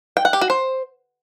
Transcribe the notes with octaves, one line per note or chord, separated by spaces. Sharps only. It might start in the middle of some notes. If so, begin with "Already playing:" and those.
G5
F#5
G4
F#4
C5